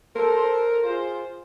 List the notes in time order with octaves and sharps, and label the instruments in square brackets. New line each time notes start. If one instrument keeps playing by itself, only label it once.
[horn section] A4 C5 [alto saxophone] A#4
[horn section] F4 G#4 C5